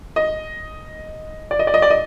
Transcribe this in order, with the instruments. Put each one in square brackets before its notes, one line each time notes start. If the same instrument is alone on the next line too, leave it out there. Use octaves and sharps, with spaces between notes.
[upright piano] D#5
D5
D#5
D5
D#5
D5
D#5